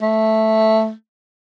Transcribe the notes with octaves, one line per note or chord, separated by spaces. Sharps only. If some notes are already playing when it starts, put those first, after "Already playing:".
A3